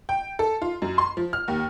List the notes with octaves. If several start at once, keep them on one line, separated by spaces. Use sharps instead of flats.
G5
A4
F4
F#2
C6
F3
F6
D#2